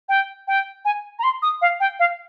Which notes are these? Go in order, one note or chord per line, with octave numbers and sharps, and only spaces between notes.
G5
G5
G#5
A#5
C6
D#6
F5
G5
F5